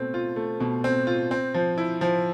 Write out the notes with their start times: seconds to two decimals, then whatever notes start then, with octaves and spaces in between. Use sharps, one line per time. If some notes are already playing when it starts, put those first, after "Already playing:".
Already playing: B2 A3 C4
0.14 F4
0.36 A3
0.60 B2
0.84 C4
1.07 F4
1.31 C4
1.54 F3
1.78 E4
2.01 F3